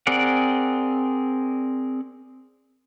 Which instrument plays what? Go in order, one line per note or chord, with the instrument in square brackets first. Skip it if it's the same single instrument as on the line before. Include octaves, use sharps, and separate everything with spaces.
[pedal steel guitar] C4 G#4 A#4 D5 F#5